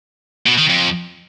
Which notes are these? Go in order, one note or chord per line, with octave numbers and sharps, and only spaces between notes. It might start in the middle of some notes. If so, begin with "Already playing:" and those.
B2
D#3
F2